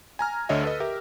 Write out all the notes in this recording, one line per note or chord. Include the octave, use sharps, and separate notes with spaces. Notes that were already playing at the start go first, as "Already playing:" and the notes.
G#5 A#5 F6
D2 D3 C#5 D#5 E5
A4 B4 D#5
G4 A#4 E5